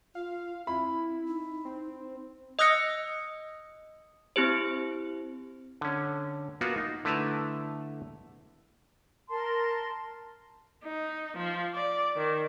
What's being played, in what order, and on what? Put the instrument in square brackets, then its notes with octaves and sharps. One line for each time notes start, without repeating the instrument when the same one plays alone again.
[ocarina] F4 [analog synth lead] F5
[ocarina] C4 [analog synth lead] E4 [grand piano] B5
[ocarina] D#4
[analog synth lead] C4
[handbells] D#5 D#6 E6 F#6 A#6 C#7
C4 E4 G4 C5
[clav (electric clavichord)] D3 C#4
A#3 B3 F4 F#4
D#4
D3 A3 E4 B4 A5 A#5
[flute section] A#4 A5 C6
[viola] D#4
F3
D5
D#3